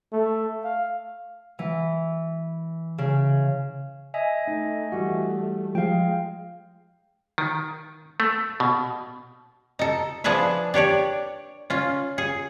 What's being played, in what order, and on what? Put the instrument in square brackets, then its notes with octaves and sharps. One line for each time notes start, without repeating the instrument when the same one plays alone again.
[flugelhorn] A3
F5
[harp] E3
C#3
[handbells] D#5 E5 G#5
[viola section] A3 [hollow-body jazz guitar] D#4
[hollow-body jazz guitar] E3 G3 F#4
[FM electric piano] F3 [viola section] G#3 [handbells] F5 G5
[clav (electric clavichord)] D#3
A3
B2
[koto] D#4 A4
F3 D4 G#4 B4 E5
D4 G4 C#5 D5
C#4 F4
G#4